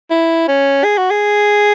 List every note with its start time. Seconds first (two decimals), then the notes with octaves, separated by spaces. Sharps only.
0.11 E4
0.48 C#4
0.84 G#4
0.98 F#4
1.11 G#4